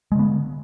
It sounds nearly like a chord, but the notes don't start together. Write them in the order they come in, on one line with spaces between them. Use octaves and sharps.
G#3 D3 B3